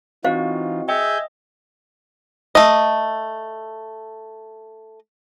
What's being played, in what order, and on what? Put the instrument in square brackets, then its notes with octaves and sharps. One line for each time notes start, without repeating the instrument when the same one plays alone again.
[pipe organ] E3 D#4 F4 [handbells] C4 F#4 [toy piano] C5 F5
[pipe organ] G#4 G#5 G6 [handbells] D#5 [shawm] E5 [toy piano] G5
[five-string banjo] A3 D#5